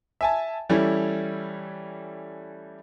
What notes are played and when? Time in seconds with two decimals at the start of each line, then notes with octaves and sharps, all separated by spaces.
0.21 E5 G#5 A5
0.69 E3 G3 A3 C#4 E4